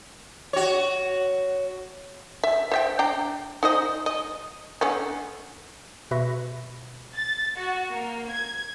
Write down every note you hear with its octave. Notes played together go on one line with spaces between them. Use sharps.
F#4 C#5
E5
C5 E5 G5
D4 G5 A#5
D#4 C5 D#5
D#5
D3 B3 C#4
B2 B4 E5 B5 C#6 A#6
A6
F#4
A#3
G#6